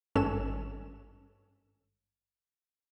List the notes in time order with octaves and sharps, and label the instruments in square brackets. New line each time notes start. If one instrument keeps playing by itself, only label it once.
[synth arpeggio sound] G#1 G2 C#4 A4 E7